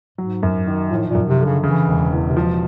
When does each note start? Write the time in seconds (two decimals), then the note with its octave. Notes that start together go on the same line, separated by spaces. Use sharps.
0.18 G#2 F#3
0.43 F#2
0.67 D#3
0.91 A2 F3
1.09 A#2
1.15 F#2
1.28 C3
1.40 D3
1.45 C#3
1.64 C#3 E3
1.88 E1
2.13 E2
2.29 C3
2.36 B2 F3